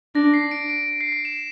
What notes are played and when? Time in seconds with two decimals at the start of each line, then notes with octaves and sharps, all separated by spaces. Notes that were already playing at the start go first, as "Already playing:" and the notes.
0.15 D4 A#6
0.34 C7
0.51 D7
0.70 D7
1.01 C7
1.12 C7
1.25 E7